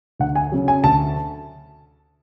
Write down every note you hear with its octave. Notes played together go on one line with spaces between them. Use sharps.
D2 F#5
G#5
C#3 F#3
G#5
D2 A5